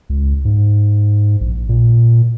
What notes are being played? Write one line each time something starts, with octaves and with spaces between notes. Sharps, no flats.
C#2
G#2
A#1
A#2